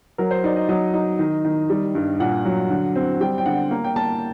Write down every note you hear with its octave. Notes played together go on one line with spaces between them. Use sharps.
F#3 A#4
C5
D#4 D5
D#5
F#3 D#5
D#4
D#3
D#3
G3
G2
A#2 F#5
F#3
D3
C4
G3 G5
G5
D3 F#5
A#3
G5
A#3 A5